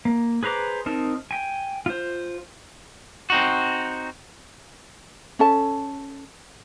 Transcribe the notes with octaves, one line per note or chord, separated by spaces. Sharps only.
A#3
G#4 B4 C5 A#5 D6
C4 D#4 A#4 A5
G5 G#5
F4 C5
C4 D#4 F#4
C#4 A4 A5